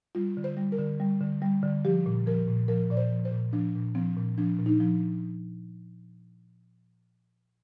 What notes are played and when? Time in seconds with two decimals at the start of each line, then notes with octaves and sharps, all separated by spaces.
0.15 G3 F4
0.37 D3
0.44 C5
0.57 G3
0.72 A#4
0.78 D3
1.00 G3
1.21 D3
1.42 G3
1.63 D3
1.85 F3 G4
2.06 A#2
2.26 F3 A#4
2.48 A#2
2.68 F3 A#4
2.91 A#2 D5
2.97 C5
3.12 F3
3.25 C5
3.32 A#2
3.53 F3 D4
3.75 A#2
3.95 F3 C4
4.17 A#2
4.38 F3 D4
4.59 A#2
4.66 D#4
4.80 F3